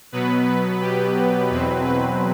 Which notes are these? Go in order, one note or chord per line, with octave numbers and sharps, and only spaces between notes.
B2 F#3 B3 B4
G4
E2 B2 F#3 C4 B4
B4